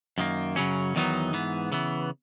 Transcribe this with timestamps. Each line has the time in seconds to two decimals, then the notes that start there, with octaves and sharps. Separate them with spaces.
0.18 F#2 D#3 A#3
0.56 F#2 C#3 F#3 C#4
0.95 E2 D#3 F#3 B3 D#4
1.33 G#2 E3 B3
1.72 C#3 E3 B3